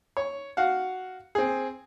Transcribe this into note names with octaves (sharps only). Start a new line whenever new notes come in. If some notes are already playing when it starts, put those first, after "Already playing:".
C#5
F#4 F5 F#5
C4 G#4